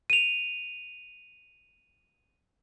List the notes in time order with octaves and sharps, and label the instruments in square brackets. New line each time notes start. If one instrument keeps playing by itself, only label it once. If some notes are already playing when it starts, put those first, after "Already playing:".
[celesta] D#7 F7